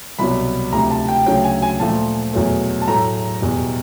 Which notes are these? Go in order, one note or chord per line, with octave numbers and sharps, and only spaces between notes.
C2 B2 F#3 B5
D2 C3 F3 A#5
A5
G5
D2 C#3 F#3 G5
G#5
G#5
A#2 F3 A3 A5
E2 B2 F#3 A3
A5
A2 F#3 A3 A#5
E2 B2 G3